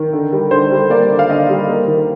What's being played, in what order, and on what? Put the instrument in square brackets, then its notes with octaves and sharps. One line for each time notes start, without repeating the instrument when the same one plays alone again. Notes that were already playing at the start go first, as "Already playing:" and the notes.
Already playing: [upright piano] D#3
D3
G3
D3 C5
G3
A#3 D5
D3
F5
D3 D#5
G3
A#3
D#3